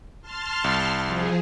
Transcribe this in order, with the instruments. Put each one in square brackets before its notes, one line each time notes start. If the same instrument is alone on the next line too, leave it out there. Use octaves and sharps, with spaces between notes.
[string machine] A5 C6 F6
[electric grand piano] C2
[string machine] F3 G#4